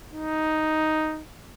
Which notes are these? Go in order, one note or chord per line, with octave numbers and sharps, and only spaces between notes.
D#4